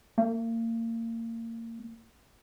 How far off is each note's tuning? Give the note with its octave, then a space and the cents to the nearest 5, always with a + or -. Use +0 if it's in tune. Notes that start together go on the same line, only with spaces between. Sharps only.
A#3 -30